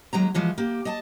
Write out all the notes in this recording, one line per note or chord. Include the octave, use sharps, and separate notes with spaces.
D#2 F#3 G#3 A#5
E3 F3 G#3 F#4
A#3 G4
D#5 G#5 A5